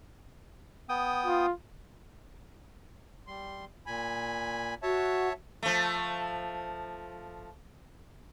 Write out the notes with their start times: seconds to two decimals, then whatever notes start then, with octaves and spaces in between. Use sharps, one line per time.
0.89 B3 G5 D#6
1.26 F4
3.27 G3 C6
3.86 A#2 G#5 B5
4.83 F#4 C#5 E5 A5
5.63 F3 A3